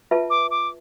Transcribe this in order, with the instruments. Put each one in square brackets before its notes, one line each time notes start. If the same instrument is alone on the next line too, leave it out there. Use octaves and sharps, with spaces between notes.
[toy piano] F4 B4 E5 A5
[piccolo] D6
D6